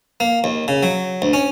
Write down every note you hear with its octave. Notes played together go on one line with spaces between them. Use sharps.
A#3
D#2
C#3
F#3
D2
C#4